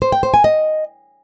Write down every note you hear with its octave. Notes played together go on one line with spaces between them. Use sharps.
C5
G5
C5
G#5
D#5